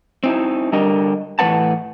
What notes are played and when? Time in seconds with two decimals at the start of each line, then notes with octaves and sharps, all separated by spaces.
0.24 C4 D#4 E4
0.72 D3 G3 D4 A#4 D#5
1.39 A2 E3 C4 B4 F#5 A5